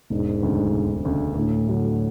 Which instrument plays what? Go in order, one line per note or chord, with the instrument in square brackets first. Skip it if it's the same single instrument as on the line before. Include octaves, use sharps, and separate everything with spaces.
[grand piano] E1 [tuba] G#2
[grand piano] D2 C#3
E1
D2 C#3
[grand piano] D2 [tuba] A2
[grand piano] D3 F#3 A3